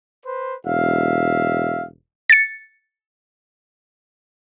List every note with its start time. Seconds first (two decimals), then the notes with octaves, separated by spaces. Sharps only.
0.24 B4 C5
0.65 E1 E5 F5
2.30 A6 C#7